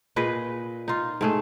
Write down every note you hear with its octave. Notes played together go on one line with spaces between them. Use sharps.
A#2 G#4 B4 D#5
D#4 F4
G#2 A3 G#4